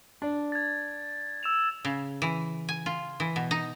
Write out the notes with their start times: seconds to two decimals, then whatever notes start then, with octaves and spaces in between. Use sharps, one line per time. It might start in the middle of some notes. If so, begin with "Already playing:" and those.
0.22 D4
0.52 G#6 A6
1.43 E6 E7 F7
1.85 C#3
2.22 E3
2.69 G#5
2.86 F4
3.20 E3
3.36 B2
3.51 D#4